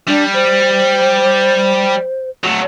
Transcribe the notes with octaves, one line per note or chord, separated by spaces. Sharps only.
G3 D4
C5
F#3 A3